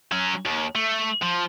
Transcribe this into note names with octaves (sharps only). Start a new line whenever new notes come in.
F#3 C#4
D#2
A3
F3